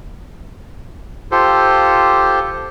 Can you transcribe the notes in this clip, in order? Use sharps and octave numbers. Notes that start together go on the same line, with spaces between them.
F4 G4 A4 C5